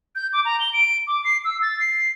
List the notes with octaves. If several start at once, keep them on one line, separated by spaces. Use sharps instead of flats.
G6
D6
A#5
G7
D7
D6
C7
E6
A6
C7